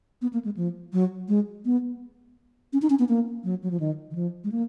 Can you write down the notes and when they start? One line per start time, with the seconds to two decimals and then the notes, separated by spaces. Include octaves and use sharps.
0.22 B3
0.33 A#3
0.45 G#3
0.57 F3
0.93 F#3
1.28 G#3
1.65 B3
2.73 C#4
2.82 D#4
2.90 C#4
2.99 B3
3.09 A#3
3.44 F#3
3.63 F#3
3.71 F3
3.80 D#3
4.11 D#3
4.15 F3
4.44 G#3
4.52 A#3